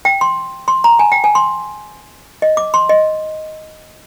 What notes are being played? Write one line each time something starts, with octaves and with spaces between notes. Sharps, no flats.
G5
C6
C6
A#5
G#5
G5
G#5
C6
D#5
D6
C6
D#5